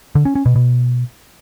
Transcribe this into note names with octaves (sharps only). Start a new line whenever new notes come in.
D3
C#4
C#4
B2
B2